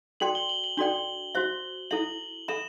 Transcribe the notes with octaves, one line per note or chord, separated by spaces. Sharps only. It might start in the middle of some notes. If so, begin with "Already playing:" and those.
F#4 A4 D5 G5 C6 F#7
G7
F#7
F#7
D4 F#4 A4 D5 G5 G7
F#4 C5 E5
E4 A4 E5 F#7
A4 E5 B5 E7